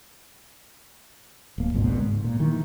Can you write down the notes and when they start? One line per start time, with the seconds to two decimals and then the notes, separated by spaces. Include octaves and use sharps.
1.58 D1 A#3
1.74 G#1 C#2 G#2 B2
2.06 G#2
2.24 A#2
2.40 D#3 E3